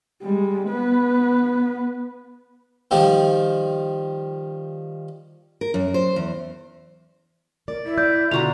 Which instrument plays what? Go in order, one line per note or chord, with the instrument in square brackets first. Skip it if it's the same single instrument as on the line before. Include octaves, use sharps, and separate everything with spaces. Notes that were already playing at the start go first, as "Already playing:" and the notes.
[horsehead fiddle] G3 G#3
B3 B4
[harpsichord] D#3 F3 G3
[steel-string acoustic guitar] A#4
F#2
C5
E2
[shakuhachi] A#4 [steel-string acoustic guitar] D5
[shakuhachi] E4
[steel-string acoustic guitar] D5 [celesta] G6
[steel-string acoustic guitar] B2 D3 [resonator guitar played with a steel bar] F4 F#4 A#5 [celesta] F7